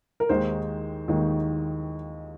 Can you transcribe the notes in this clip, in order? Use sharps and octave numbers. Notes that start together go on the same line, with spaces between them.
A#4
D#2 D#3 G#3 D#4 C5
D#2 D#3 G#3 D#4